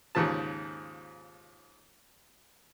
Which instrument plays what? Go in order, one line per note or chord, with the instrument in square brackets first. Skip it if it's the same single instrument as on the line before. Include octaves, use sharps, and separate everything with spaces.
[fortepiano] D#2 G#2 C#3 F3 A5